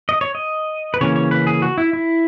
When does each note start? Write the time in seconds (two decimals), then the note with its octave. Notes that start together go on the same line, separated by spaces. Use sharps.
0.09 D#5
0.21 C#5
0.35 D#5
0.94 B4
1.01 C#3 E3 A#3 C#4 C#5
1.16 C#5
1.31 B4
1.47 G#4
1.62 F#4
1.78 E4
1.93 E4